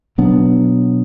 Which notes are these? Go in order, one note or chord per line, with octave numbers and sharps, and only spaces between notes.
B2 F#3 B3 D4